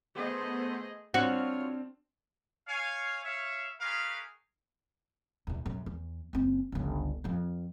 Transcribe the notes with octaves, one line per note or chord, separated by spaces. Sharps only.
A3 B3 G#4 C5 D#5
C4 D4 F4 F#4 C5 C#5 F6
C#5 F5 G#5
C#5 E5 F5
G4 G#4 A#4 B4 C#5 F5
E2 B2
B1 F#2
E2
F#1 C4
G1 C#2
F2 F3